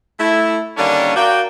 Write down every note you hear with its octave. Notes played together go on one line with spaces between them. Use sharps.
A3 E4
D3 D#3 G3 A#3 C#4 D4
F#4 A#4 D5 F5 G5